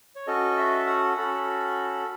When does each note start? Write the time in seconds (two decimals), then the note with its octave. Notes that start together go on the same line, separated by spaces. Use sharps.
0.16 C#5
0.27 C#4 F#4 A4 D#5
0.57 E5
0.87 F#5
1.17 C#4 F#4 A4 B5